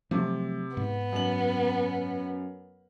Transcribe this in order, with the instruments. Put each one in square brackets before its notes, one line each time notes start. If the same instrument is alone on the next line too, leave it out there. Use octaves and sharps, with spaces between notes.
[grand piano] C3 [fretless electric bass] F3 F#3 A3
[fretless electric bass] G#2 [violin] B3
[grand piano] F#2 F#7